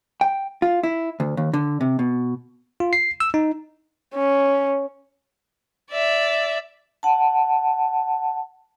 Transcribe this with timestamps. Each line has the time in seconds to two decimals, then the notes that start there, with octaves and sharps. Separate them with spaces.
0.21 G5
0.62 F4
0.83 E4
1.20 D2
1.37 D#2
1.54 D3
1.81 C3
1.99 B2
2.80 F4
2.93 C7
3.20 E6
3.34 D#4
4.15 C#4
5.91 D5 E5
7.03 F#5 A5